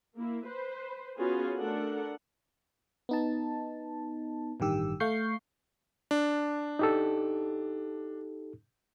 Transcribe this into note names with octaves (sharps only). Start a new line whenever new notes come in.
A#3 E4
B4 C5
B3 C#4 F4 F#4 G#4 B4
A3 D4 A4 A#4 F#5
B3 D#4 A5
A1 G2 D#3 G4 E6
A3 F5 C#6 G6 C7
D4
D#4 G4 A4